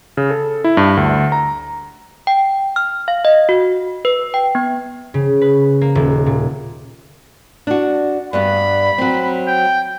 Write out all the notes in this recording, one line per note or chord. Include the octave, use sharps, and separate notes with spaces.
C#3
A4
E4
G2
D2
A#5
G5
F6
F5
D#5
F#4
B4
G5
B3
C#3
B4
A#3
D#1
A#2
D4 F#4
G2 G3 B3 B5
F#3 C4
G5